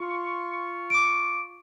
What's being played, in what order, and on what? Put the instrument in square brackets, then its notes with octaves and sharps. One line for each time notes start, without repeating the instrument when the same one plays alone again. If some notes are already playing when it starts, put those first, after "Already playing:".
[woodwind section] F4 C#6
[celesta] D6 D7